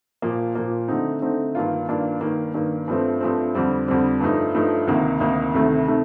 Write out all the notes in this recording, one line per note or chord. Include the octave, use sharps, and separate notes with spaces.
A#2 F3 A#3
A#2 F3 A#3
D3 A3 C4 D#4
D3 A3 C4 D#4
G2 D#3 A#3 D4 F4
G2 D#3 A#3 D4 F4
G2 D#3 A#3
G2 D#3 A#3
G2 F3 A3 C4
G2 F3 A3 C4
F2 D3 G3 C4
F2 D3 G3 C4
G2 F3 A3 D#4
G2 F3 A3 D#4
D2 C3 D#3 A#3 D#4
D2 C3 D#3 A#3 D#4
D2 C3 D#3 A3
C3 D#3 A3